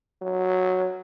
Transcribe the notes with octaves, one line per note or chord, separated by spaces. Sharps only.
F#3